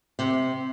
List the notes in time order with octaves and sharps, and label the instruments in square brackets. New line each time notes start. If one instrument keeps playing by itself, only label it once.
[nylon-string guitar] C3